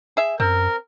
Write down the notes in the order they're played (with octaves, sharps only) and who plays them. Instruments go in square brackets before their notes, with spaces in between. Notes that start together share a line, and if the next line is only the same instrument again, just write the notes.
[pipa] G#4 E5
[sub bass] F#2 [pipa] C4 [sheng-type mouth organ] A#4